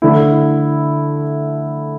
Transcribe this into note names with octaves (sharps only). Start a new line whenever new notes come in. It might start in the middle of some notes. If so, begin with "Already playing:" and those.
D3 A3 E4